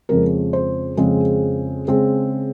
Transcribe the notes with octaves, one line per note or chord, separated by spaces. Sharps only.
F2 C#3 G#3 C4 A#4
C5
F2 C#3 G#3 C4
C#3 G#3 C4